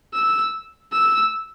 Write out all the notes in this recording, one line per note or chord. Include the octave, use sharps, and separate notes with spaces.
E6
E6